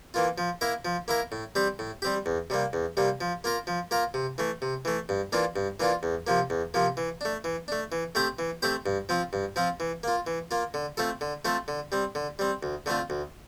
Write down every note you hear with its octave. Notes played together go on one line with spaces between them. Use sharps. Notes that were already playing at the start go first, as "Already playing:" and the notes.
E3 A#3 F4
F3
A#3 E4 A#4
F3
A#3 E4 A#4
A2
G3 C4 G4
A2
G3 C4 G4
E2
C3 G3 A#3
E2
C3 G3 A#3
F3
A#3 F4 A#4
F3
A#3 F4 A#4
C3
E3 A3
C3
E3 A3
G2
E3 A#3 D4 F4
G2
E3 A#3 D4 F4
E2
C3 F3 A#3
E2
C3 F3 A#3
E3
A3 D4
E3
A3 D4
E3
A3 C4 G4 C5
E3
A3 C4 G4 C5
G2
F3 C4 F4
G2
F3 C4 F4
E3
A#3 F4
E3
A#3 F4
D3
A3 C4 F4 A4
D3
A3 C4 F4 A4
D3
G3 C4
D3
G3 C4
D2
D3 A3 C4 F4
D2